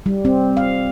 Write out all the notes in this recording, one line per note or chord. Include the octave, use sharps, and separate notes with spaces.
G3
C4
F5